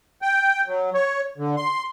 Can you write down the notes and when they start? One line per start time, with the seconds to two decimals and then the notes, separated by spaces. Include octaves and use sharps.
0.22 G5
0.67 F#3
0.94 C#5
1.38 D3
1.57 C6